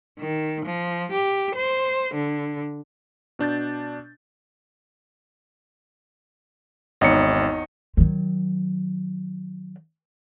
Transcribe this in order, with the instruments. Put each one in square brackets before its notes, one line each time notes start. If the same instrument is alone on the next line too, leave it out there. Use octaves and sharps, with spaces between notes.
[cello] D#3
F3
G4
C5
D3
[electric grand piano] B2 D4 G6 A6
[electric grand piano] G#1 C#7 [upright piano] E2 D#4 C#5
[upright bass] D#3 F#3